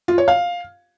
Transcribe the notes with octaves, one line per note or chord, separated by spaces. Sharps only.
F4
C#5
F5